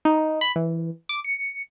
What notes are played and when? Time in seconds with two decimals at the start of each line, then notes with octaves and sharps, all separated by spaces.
0.05 D#4
0.41 B5
0.56 E3
1.09 D6
1.24 C#7